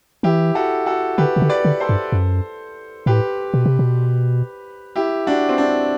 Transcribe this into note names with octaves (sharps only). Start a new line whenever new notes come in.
E3 E4 G4
F#4 A4
F#4 A4
D3 G4 B4
C3
D3
B4 D5
D3
A4 C5
G2
F#2
A2 G4 B4
B2
C3
B2
E4 G4
D4 F#4
C4
D4